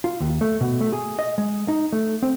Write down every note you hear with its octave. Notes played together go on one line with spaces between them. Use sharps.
F4
D#2
A3
B2
A3
G#4
D#5
G#3
D#4
A3
C4